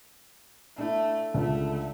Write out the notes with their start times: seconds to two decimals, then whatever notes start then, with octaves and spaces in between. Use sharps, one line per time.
0.78 A3 D4 E4
1.34 C#2 D3 A3